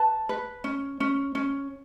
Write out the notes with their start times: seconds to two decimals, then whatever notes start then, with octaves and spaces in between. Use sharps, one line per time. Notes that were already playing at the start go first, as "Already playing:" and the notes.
Already playing: B4 A5
0.29 B4
0.64 C#4
1.00 C#4
1.35 C#4